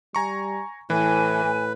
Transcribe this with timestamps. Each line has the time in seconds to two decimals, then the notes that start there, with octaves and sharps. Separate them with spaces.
0.15 G3 G#5 A#5 C#6
0.90 A2 E3 B4 G#5
1.44 A2